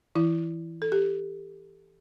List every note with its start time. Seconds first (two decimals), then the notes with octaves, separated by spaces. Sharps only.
0.15 E3 E4
0.82 A4
0.92 G4